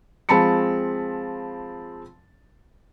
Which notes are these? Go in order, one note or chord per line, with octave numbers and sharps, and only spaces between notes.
F3 G#3 C4 A5 B5 C#7